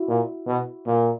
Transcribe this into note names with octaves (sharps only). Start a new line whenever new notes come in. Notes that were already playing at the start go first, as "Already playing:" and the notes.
Already playing: E4 F#4
A#2
B2
A#2